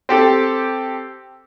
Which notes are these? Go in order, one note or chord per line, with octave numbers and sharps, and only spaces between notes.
C4 G4 A4